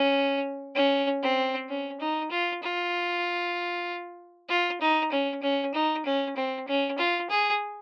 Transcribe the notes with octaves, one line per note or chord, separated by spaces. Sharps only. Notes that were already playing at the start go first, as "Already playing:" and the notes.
Already playing: C#4
C#4
C4
C#4
D#4
F4
F4
F4
D#4
C#4
C#4
D#4
C#4
C4
C#4
F4
G#4